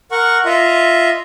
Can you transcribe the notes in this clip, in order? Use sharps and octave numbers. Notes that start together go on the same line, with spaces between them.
A#4 F#5 C#6
F4 D#5 E5